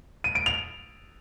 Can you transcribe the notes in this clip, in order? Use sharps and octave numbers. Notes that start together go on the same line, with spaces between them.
D#7
D7
F7